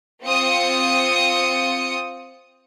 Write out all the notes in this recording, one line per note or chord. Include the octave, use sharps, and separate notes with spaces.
C4 F4 D#6 C#7